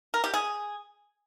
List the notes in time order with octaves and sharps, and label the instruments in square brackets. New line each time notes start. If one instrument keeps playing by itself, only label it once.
[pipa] A#4
G4
G#4